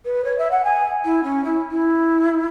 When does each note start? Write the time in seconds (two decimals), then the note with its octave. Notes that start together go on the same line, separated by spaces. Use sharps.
0.05 B4
0.25 C#5
0.38 E5
0.51 F#5
0.64 G#5
1.05 E4
1.23 C#4
1.44 E4
1.70 E4